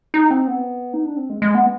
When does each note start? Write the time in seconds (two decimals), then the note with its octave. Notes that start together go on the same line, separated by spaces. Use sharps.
0.14 D#4
0.31 C4
0.48 B3
0.94 D#4
1.05 D4
1.16 C4
1.30 G#3
1.42 G#3
1.55 B3